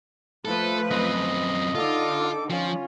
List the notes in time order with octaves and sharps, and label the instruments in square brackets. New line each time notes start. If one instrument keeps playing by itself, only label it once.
[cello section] F3 A3 B4 [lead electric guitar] A4
[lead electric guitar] F#2 C4 [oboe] D#5
[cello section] D3 D#4 [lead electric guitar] F4 [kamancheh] A4 D6
[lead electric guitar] F3 [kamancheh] C#4 F4